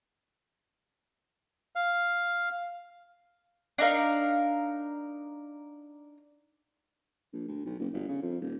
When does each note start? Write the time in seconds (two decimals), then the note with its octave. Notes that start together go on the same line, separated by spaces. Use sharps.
1.76 F5
3.78 D4 D#4 A#4 F5
7.33 A#1
7.48 D2
7.66 B1
7.79 F#1
7.93 G1
8.08 C#3
8.22 F2
8.41 D#1